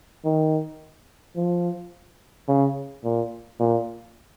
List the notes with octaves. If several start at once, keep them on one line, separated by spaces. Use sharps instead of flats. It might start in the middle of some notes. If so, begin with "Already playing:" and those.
D#3
F3
C#3
A#2
A#2